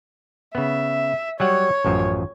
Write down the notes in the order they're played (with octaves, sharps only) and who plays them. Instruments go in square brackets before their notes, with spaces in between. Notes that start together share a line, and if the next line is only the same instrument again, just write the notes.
[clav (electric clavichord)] C#3 B3 [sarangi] E5
[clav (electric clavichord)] F#3 G3 F#5 [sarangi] C#5
[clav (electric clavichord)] A1 F#2 F3